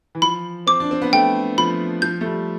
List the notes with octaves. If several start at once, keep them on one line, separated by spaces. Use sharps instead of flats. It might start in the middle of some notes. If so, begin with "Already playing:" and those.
E3
F3 B5
C4 D6
D4
C4
B3
A3 G5
F3 B5
F3 G6
A3
G3